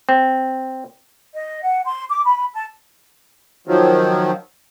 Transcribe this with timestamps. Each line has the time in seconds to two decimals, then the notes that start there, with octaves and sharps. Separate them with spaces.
0.09 C4
1.34 D#5
1.63 F#5
1.85 C6
2.10 D6
2.25 B5
2.54 A5
3.67 D#3 F3 F#3